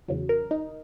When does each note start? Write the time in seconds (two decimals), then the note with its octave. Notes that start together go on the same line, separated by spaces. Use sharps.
0.08 E2 C#3 F#3
0.29 A#4
0.51 D#4